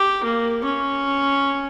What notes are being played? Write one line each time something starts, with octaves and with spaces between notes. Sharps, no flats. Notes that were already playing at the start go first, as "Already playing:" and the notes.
Already playing: G4
A#3
C#4